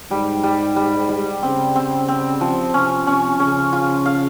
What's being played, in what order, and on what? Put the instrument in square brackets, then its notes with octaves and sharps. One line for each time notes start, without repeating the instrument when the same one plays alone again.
[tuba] G#2 [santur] G3
[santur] G3
G3
G3
[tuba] C#3 [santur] C4
[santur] C4
C4
F3
[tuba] C3 [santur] C#4
[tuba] C3 [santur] C#4
[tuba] C#3 [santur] C#4
[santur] F4
F5